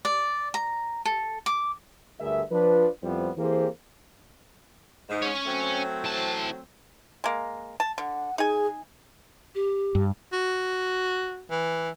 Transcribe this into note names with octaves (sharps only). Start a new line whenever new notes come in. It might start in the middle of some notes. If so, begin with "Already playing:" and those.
D5
A#5
A4
D6
D2 G2 D3 G#4 A#4 E5
F3 D4 B4
F2 G3 B3 E4 F4 C5
E3 A#3 C4 G4 G#4 C5
G#2
C#4 C#5
F#3 A3 C4
E3 A5
G#3 A#3
A5
D3 F#5
D#4 G#4 G#5
G4
G2
F#4
E3